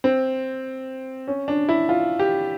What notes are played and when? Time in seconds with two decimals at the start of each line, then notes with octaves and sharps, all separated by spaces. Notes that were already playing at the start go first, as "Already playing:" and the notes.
0.04 C4
1.28 C#4
1.48 D4
1.69 E4
1.89 F4
2.19 G4